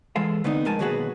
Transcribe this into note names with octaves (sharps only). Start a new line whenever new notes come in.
E3 G#3 A4 F5
D3 A3 B3 C4 D#4
F2 G#3 A#4 G#5 A5
D#2 B2 F#3 F#4 G#4 B4